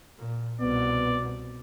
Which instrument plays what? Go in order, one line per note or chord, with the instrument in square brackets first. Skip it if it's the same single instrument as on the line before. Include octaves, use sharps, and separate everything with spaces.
[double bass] A#2
[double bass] C2 B2 [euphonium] B3 [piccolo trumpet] D5